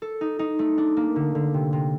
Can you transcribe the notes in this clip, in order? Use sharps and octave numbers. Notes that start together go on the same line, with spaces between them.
A4
D#4
D#4
A3
D4
A#3
D3
D3
C3
C3